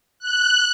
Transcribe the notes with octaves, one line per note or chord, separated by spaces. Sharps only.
F#6